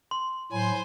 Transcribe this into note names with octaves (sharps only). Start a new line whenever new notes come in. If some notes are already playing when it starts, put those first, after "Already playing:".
C6
A2 F#3 E4 C5 G#5